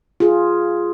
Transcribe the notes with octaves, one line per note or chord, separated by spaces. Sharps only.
F4 G#4